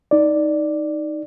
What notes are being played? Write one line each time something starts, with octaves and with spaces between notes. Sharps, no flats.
D#4 D5